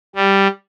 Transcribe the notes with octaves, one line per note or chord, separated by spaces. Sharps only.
G3